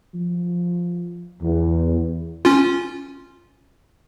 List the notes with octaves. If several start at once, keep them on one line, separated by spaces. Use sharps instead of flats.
F3
E2
C#4 F4